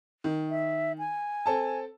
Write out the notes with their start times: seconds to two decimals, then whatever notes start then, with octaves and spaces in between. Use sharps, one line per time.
0.24 D#3
0.50 E5
0.98 G#5
1.46 C4 A4 A5